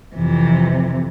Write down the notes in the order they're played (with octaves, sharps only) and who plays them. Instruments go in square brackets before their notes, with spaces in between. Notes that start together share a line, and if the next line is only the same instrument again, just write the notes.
[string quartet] F2 C3 E3